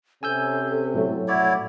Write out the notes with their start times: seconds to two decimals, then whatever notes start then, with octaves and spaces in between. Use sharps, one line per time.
0.23 C3 C#4 A4 G#5 E6 G6
0.94 A2 F#3 A3
1.28 E4 C#5 D5 F#5